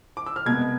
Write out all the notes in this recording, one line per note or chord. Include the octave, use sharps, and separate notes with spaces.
D6
E6
F6
C2 B2 G#3 B3 G#6